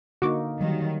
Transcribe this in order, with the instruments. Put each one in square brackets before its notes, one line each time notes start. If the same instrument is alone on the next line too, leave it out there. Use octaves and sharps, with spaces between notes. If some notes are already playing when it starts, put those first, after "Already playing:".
[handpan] D3 A#3 D#4 [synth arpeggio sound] F#4 C#6 D6
[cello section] D#3 [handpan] F#3 G3